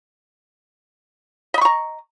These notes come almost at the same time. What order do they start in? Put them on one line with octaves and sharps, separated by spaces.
D#5 B5 C#6 A#5